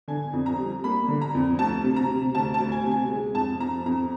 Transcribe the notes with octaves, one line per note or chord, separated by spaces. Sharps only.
D3 G#5
F2
A#5
G3
A#3 B5
D3
A#5
F2
D2 A5
C3
A#5
C3
D2 A5
A5
D2
G#5
C3
G#5
G#3
F2 A5
F2 A#5
F2 A#5